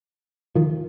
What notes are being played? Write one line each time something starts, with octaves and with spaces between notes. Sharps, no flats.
D#3 F3